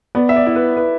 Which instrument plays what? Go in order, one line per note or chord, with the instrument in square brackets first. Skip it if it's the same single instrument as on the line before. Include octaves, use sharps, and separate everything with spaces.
[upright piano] B3 [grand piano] D5
[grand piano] E5
D5
[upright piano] E4
[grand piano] B4
B4